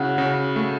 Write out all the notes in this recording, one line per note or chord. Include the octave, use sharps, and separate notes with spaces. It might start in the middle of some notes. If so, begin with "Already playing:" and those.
Already playing: C#3 E4 F#4
C#3
A3